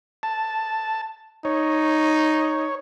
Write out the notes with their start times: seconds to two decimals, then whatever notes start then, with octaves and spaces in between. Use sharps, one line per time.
0.23 A5
1.45 D#4 C#5